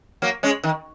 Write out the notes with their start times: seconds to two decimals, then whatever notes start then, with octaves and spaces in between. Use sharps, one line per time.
0.22 F#3 A#3
0.43 G#3 C#4
0.64 D#3